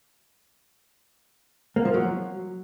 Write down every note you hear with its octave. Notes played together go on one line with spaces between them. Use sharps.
A#3
F3
F#3